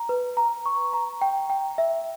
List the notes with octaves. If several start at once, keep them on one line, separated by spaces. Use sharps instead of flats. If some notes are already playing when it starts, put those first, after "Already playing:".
Already playing: A#5
B4
A#5
C#6
A#5
G5
G5
E5